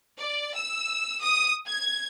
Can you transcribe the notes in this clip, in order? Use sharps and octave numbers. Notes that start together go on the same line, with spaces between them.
D5
E6
D#6
G#6